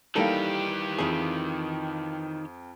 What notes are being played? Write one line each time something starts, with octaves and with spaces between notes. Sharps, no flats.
D#3 E3 G3 A#3 D#4 G4 A4 F5
F2 E3 F4 G#4